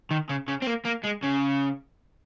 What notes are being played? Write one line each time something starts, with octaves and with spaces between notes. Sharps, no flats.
D#3
C#3
C#3
C4
A#3
A#3
G#3
C#3